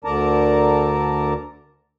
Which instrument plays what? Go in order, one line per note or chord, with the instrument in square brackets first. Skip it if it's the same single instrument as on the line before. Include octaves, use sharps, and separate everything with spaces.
[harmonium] D2 D3 A#4 D5 A5 A#5